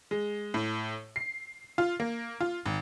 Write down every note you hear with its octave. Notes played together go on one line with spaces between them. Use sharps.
G#3
A2
C7
F4
A#3
F4
G#1